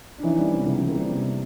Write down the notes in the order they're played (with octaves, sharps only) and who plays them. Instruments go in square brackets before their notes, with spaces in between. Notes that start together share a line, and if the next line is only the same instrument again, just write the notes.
[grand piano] D4
[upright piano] E3 [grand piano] C#4 D#4
[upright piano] G3 [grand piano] C4 D4
[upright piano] C3 [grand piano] B3 C#4
[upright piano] C#2
E3
[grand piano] A#3 C4
[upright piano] G3
C3